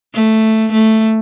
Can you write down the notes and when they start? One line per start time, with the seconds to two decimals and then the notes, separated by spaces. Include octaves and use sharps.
0.14 A3
0.72 A3